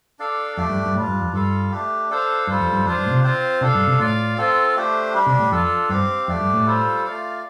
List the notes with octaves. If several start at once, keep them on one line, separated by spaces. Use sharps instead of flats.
D4 A4 D5 F5
F2 A3 D4 G4 D5
G2
G2
A2 G3 D4 F4
G2
F2
G2 G3 F4 A4 F5
A3 D4 G4
D4 A4 C5 F5
G2 G3 F4 A4 C5
F2
G2
F2 D4 F4 C5
G2
A2
C3
C4 F4 C5
C3 D4 A4 F5
G2
C3
A2 F4 D5 F5
C4 F4 A4
A3 D4 G4 C5
G3 D4 G4
C3
A2
F2 D4 F4 A4
G2 C4 G4 F5
F2 A3 D4 G4 D5
G2
A2
G3 F4 A4 C5
A3 F4 D5 F5